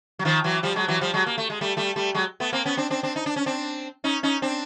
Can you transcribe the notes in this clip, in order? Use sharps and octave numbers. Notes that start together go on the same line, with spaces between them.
F#3
D#3 F3
E3 F#3
F3 G3
F#3 G#3
E3 F#3
F3 G3
F#3 G#3
A#3
A3
G#3
G3 A3
G3 A3
G3 A3
F#3 G#3
A3 B3
A#3 C4
B3 C#4
C4 D4
C4 D4
C4 D4
D#4
D4
C#4
C4 D4
C#4 D#4
C#4 D#4
C4 D4